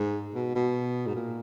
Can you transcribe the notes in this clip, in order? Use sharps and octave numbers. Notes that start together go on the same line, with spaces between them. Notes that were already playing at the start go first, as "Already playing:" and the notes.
Already playing: G#2
B2
B2
G#2
A#2